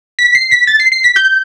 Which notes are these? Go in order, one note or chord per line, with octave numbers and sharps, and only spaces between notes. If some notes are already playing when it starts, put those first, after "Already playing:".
B6
C7
B6
A6
C7
C7
B6
G6